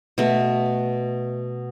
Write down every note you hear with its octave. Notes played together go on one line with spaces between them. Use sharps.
B2 A3